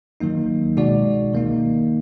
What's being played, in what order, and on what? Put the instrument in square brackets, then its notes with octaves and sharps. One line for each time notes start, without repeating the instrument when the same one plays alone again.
[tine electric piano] D#3 F#3 A#3 D#4
B2 G#3 D#4 F#4 D5
D#3 A#3 D#4